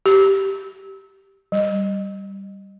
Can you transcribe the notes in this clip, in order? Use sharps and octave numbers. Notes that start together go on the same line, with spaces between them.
G4
G3